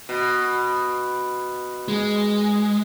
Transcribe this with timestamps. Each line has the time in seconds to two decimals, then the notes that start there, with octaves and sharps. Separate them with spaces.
0.09 B2
1.88 G#3